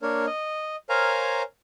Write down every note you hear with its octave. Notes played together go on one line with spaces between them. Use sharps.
A#3 D4 A#4 C#5
D#5
A#4 C5 C#5 F5 G#5 A#5